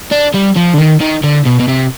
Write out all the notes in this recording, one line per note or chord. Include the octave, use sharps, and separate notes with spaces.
D4
G3
F3
D3
D#3
D#3
D3
B2
B2
C3